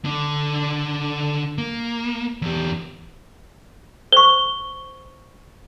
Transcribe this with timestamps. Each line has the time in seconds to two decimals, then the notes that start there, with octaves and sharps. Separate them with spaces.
0.05 D3 D4
1.58 A#3
2.42 E2 G4
4.12 C5 C#6 G7